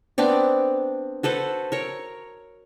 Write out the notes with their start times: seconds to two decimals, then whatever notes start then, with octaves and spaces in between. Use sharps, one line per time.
0.18 B3 C4 D4 D5
1.23 F#4 A4 B4 C5
1.72 A#4 C#5